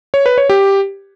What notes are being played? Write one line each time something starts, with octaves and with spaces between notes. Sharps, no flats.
C#5
B4
C#5
G4